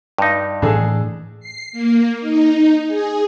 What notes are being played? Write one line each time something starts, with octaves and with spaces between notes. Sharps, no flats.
G2 D#4
A2 E3 A3 D4 G#4 A4
C7
A#3
D#4
G#4